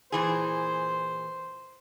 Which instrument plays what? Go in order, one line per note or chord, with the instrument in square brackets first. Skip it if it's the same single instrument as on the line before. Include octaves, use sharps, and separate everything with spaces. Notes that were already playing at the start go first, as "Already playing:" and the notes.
[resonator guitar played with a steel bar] A#2 E3 G#4 [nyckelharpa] C5